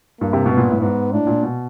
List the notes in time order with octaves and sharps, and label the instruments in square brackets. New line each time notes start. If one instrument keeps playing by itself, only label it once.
[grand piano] G2 [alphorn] A#3
[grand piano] C3
B2
[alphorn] B3
[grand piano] A#2
A2
[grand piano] G#2 [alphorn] B3
[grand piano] A2 [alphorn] D4
[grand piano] A#2
B2